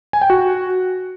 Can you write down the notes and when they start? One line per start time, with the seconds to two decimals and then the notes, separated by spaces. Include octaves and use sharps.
0.13 G#5
0.22 G5
0.30 F#4